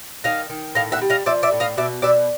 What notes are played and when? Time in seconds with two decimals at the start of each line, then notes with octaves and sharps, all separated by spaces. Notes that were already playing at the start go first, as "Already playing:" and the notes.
0.24 D#3 D#5 F5
0.49 D#3
0.75 A2 D#5 F5
0.92 E5 F#5
1.02 G3
1.10 D#5 F5
1.26 F3 D5 E5
1.43 D5 E5
1.52 A2
1.60 D#5 F5
1.77 B2 D5 E5
2.02 B2 D5 E5